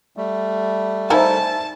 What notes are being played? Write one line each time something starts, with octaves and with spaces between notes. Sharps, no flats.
G3 A3
D#4 E4 A#4 C5 E5 G#5 A5